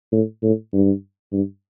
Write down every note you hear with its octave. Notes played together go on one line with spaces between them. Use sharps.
A2
A2
G2
G2